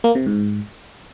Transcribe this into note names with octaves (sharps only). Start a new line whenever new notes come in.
A#3
C3
G#2